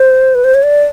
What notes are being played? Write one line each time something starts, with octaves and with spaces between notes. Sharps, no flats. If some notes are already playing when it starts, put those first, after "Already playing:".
Already playing: C5
B4
C5
C#5
D5